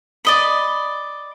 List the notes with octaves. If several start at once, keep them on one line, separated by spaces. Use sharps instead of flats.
D5 D#5 B5